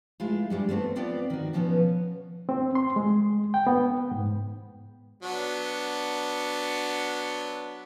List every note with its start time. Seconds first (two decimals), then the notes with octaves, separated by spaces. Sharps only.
0.20 G#3 A3 E4 F4
0.50 G2 G3 G#3
0.69 A3 B3 C4 A4
0.95 B3 C4 F4 D5 G5
1.30 D#3 F#4
1.53 B2 F3 B3 C#4
2.49 C4
2.75 C6
2.96 G#3
3.54 G5
3.67 B3
4.11 G#2
5.23 F#3 B3 D4